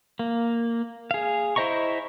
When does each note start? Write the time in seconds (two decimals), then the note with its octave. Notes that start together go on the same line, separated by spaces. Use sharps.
0.19 A#3
1.11 G#4 F5
1.56 E4 C5 D#5 A#5 C#6